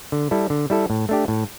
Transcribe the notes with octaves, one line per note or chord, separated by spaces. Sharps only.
D3
G3 E4 A4
D3
G3 E4 A4
A2
A3 D4 G4
A2